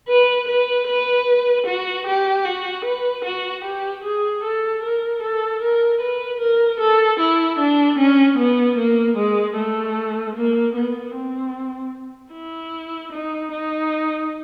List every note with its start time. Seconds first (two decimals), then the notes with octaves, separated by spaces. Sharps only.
0.08 B4
0.48 B4
0.88 B4
1.67 F#4
2.06 G4
2.45 F#4
2.85 B4
3.25 F#4
3.64 G4
4.04 G#4
4.43 A4
4.83 A#4
5.22 A4
5.62 A#4
6.01 B4
6.40 A#4
6.80 A4
7.20 E4
7.59 D4
7.99 C#4
8.38 B3
8.78 A#3
9.17 G#3
9.57 A3
10.36 A#3
10.75 B3
11.15 C4
12.33 E4
13.12 D#4
13.52 D#4